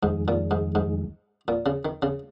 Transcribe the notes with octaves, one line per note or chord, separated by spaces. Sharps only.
F2 G#2 D#3 G#3
A#2
G#2
G#2
A#2
C#3
D#3
C#3